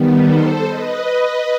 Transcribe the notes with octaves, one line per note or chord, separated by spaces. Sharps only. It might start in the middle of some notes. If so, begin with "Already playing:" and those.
Already playing: D#3 G3 B3
A4 C5
B4 D#5